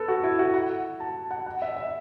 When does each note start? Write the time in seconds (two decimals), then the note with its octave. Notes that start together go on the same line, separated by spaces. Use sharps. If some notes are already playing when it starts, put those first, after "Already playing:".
Already playing: A4 B4
0.08 F#4
0.24 E4
0.39 F#4
0.54 F#5
1.00 A5
1.31 F#5
1.46 F#5
1.62 E5
1.77 E5